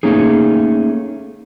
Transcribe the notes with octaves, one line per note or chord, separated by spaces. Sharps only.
A3 A#3 C#4 D#4 G#4